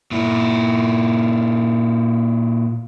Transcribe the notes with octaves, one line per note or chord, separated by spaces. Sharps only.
A#2 E4